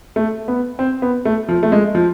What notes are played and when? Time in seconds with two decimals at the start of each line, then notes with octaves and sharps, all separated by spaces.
0.16 A3
0.48 B3
0.79 C4
1.02 B3
1.25 A3
1.49 F3
1.63 A3
1.72 G#3
1.95 F3